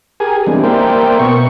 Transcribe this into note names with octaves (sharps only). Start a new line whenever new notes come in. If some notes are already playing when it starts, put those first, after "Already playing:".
G4 G#4 A#4 G#5
E3 G3 G#3 B3 C4 D4
A#3 A#4 C5 D5 E5 G5
B2 B3 C#6